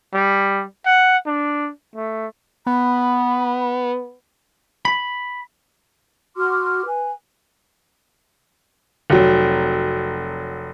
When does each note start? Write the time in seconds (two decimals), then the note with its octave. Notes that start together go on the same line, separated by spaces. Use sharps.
0.14 G3
0.85 F#5
1.26 D4
1.96 A3
2.67 B3 B5
4.85 B5
6.36 F#4 C6 D6 F6
6.87 B4 G#5
9.10 F1 F#3